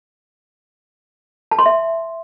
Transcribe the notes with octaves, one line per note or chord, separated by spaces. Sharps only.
A5
C6
E5